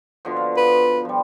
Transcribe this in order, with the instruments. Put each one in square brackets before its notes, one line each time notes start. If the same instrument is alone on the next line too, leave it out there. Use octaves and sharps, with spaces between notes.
[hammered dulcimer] B2 D3 F3
F5
[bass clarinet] B4
[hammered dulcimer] F3 G3